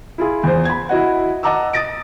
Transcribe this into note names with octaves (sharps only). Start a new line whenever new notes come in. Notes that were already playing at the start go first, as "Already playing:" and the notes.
E4 F4 G#4
E2 C5
B5 G#6
E4 F#4 D#5 F#5
D#5 F#5 A5 A#5 D6 E6
D#6 A6 A#6 D7